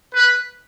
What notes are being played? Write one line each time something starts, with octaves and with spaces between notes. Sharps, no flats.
B4